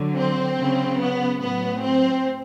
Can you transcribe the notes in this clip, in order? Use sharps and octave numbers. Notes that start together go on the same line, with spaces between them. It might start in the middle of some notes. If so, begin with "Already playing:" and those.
Already playing: D3 F#3
C4
C#3 F#3
B3
A2 F#3 B3
C4